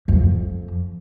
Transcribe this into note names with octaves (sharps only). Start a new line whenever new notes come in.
F2